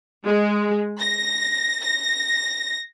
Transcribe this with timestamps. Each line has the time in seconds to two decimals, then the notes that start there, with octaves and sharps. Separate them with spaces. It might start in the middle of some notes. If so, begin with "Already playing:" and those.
0.24 G#3
1.00 A#6
1.82 A#6